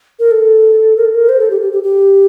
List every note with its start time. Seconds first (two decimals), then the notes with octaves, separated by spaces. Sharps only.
0.19 A#4
0.31 A4
0.97 A#4
1.05 A4
1.14 A#4
1.29 C5
1.40 A4
1.51 G4
1.62 G4
1.72 G4
1.83 G4